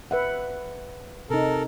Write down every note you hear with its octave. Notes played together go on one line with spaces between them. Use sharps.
B4 E5 F#5
C3 D#4 A4 A#4